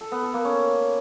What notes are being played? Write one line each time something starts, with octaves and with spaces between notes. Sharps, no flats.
A4
B3
A4
A#3
C#4